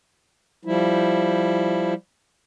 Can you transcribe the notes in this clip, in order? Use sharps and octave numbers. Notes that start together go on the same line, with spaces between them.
F3 G3 E4